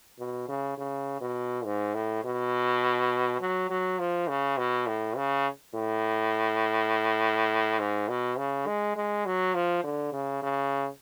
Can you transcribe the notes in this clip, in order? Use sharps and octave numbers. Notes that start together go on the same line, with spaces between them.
B2
C#3
C#3
B2
G#2
A2
B2
F#3
F#3
F3
C#3
B2
A2
C#3
A2
G#2
B2
C#3
G#3
G#3
F#3
F3
D3
C#3
C#3